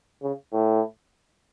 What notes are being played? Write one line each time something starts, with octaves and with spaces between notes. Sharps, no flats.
C#3
A2